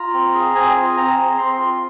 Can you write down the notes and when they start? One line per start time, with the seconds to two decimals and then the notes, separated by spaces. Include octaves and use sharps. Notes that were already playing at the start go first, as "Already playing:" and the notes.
Already playing: F4 A#5
0.14 C4
0.34 G#4
0.55 C4 G#5
0.76 F4
0.97 C4 A#5
1.18 G#4
1.38 C4 C6
1.58 F4